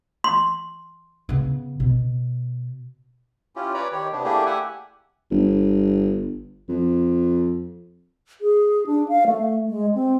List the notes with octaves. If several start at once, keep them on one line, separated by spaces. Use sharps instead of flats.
C6
C#3 B3
B2
C#4 E4 F4 G4
B4 C#5 D5 A#5 B5
D#3 G4 C#5
C3 B3 D4
A3 A#3 D4 E4 G4 G#4
G4 E5 F#5 G#5
G1
F2
G#4
D4
F5
A3
G#3
C4